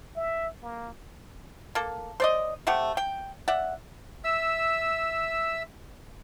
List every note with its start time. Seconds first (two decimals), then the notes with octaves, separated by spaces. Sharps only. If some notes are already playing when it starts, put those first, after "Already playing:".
0.16 E5
0.63 A#3
1.75 A#3 A4
2.20 C5 D5 D#5
2.67 C3 A3 G4 F#5
2.97 G5
3.48 D5 E5 F#5
4.24 E5 E6